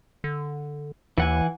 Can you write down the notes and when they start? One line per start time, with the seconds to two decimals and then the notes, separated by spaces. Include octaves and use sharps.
0.24 D3
1.18 D#2 E3 F#5 G#5